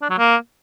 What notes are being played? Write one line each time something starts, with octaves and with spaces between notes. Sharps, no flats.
D4
F#3
A#3